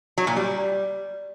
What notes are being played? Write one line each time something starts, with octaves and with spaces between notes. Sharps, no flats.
F#3
A#2
G3